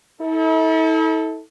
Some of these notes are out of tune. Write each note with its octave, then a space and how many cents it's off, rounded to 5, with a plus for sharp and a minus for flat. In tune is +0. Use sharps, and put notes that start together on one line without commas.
E4 -45 A4 +0